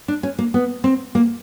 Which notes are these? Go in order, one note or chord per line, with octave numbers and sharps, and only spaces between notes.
D4
C#4
A#3
B3
C4
A#3